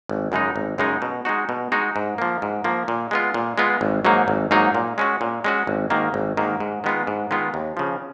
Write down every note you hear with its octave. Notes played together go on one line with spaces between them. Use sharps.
G#1
F#2 C#3 G#3 D#4
G#1
F#2 C#3 G#3 D#4
B2
G#3 D#4 F#4
B2
G#3 D#4 F#4
G#2
F3 A#3
G#2
F3 A#3
A#2
G#3 B3 F4
A#2
G#3 B3 F4
G#1
G#2 F#3 A#3 D#4
G#1
G#2 F#3 A#3 D#4
A#2
G#3 C#4 F#4
A#2
G#3 C#4 F#4
G#1
G#2 D#3 A#3
G#1
G#2 D#3 A#3
G#2
D#3 G#3 B3 F4
G#2
D#3 G#3 B3 F4
D#2
C#3 F3